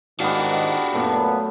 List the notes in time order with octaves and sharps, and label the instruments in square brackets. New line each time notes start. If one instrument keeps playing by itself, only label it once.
[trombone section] G#2 D#3 [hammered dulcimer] B3 F5 [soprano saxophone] D4 [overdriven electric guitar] F#4 G4
[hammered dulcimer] F#2 A3 [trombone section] A#2 B3